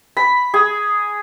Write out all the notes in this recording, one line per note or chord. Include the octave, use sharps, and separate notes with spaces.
B5
G#4